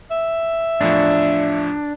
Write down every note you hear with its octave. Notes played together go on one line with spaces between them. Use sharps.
E5
E2 A2 F3 D4